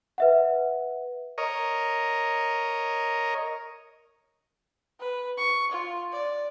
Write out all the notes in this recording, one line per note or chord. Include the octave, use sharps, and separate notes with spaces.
B4 E5 F#5
A#4 C#5 D#5
B4
C#6
F4
D5